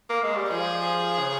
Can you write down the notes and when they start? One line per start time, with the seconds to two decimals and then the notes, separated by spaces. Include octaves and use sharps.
0.09 A#3
0.23 G#3
0.36 G3
0.50 F3 G#4
1.19 C#3